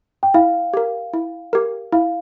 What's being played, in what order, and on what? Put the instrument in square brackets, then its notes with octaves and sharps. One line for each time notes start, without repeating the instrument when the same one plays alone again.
[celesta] G5
[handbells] E4 [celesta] F5
[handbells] G4 A#4
E4
G4 A#4
[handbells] E4 [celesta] F5